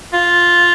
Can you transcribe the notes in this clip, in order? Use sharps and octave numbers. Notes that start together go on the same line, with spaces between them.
F4